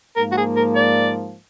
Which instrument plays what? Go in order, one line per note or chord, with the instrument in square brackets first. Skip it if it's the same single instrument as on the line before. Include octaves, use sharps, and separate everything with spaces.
[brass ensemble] G#2 F3 A#3 [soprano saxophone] A#4
[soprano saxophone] F#4
G#4
A#4
D5